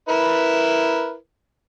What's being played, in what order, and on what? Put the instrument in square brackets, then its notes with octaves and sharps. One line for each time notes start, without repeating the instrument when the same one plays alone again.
[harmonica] E4 A#4 B4